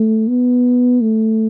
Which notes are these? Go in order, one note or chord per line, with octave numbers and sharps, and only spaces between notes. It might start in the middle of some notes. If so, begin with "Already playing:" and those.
Already playing: A3
B3
A3